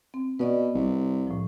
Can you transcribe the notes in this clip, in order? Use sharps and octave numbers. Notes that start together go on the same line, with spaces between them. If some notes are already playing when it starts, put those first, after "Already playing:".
C4
B2 B4 D5 D#5
C2
A2 F3